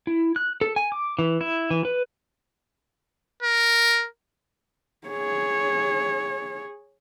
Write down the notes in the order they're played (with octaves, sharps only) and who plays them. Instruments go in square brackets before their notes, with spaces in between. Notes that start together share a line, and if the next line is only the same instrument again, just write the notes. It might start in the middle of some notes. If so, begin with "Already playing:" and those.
[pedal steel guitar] E4
F#6
A4
G#5
D6
E3
E4
E3
B4
[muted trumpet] A#4
[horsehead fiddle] G#4 C#5